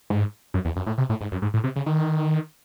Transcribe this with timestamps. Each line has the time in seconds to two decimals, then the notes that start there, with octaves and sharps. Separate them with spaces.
0.10 G#2
0.54 F#2
0.65 E2
0.76 F#2
0.86 A2
0.98 C3
1.09 A2
1.21 G#2
1.32 F#2
1.42 G#2
1.54 A2
1.64 C3
1.76 C#3
1.86 D#3